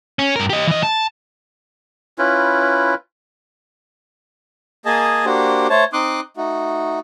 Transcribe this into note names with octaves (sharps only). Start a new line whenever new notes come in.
C#4
G2 A#4
G4 D#5
E3 D#5
A5
C#4 E4 F4 B4
A#3 G#4 D#5 G#5 A5
A#3 D4 F#4 G4 C5
A3 C5 C#5 A5
C4 D#4 C6 D6 D#6 F#6
A3 D#4 F#4